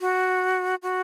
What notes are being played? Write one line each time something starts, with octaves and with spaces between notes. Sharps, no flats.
F#4
F#4